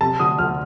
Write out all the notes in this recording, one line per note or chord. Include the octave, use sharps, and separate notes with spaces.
C3 A5
D2 D#6
D2 F6